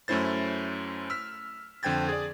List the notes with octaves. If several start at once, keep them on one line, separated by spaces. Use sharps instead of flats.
F#2 A3 C#4 E4 C5 A6
E6 F6 B6
F2 D3 C5 G5 G#6 A6
G#4 D5